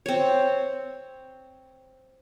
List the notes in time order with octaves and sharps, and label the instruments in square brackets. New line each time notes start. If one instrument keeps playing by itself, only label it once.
[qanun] C4 C#5